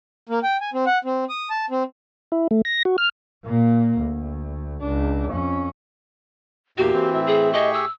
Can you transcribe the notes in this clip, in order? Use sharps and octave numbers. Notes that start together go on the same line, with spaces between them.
A#3
G5
G#5
C4
F#5
C4
D#6
A5
C4
E4
A3
A#6
F#4
F6
A#2 A#3
D2
C#2 D4
F2 C#4
E2 A#2 A#3 E4 F#4 G4
E3 C4
A2 A4 E5
G#4
G4 G#4 D#5 C#6
E6